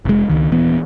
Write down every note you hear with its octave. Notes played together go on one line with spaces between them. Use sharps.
F1 G#3
C#2 D#3
D#1 E3 B3